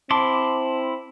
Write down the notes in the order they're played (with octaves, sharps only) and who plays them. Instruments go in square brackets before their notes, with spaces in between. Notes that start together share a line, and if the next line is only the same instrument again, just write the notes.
[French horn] C4 [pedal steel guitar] E4 C6 D6 [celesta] A5